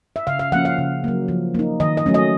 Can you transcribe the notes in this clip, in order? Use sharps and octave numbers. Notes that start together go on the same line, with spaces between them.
E5
C#3 F5
F5
F3 A#3 C#4 F#5
F5
C#3
F#3 A#3
F3
A#3 D#4
D#3 D#5
D#5
F#3 A3 C#4
D#5